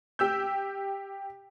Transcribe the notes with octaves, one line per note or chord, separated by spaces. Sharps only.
G4 E6 G6